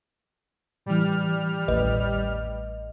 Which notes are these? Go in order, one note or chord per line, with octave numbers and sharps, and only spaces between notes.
A2 E3 G3 F6
A1 D#2 B4 D#5